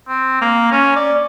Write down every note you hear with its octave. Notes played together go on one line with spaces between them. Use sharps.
C4
A#3
C#4
D5